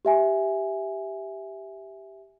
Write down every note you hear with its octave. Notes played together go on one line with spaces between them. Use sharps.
G4 E5 G#5